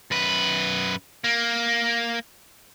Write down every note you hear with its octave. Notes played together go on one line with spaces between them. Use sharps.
F#2 B4
A#3